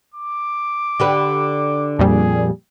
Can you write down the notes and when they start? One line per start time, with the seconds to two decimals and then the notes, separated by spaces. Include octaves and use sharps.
0.14 D6
1.00 D3 G4 B4
1.99 F2 A#2 G3 G#4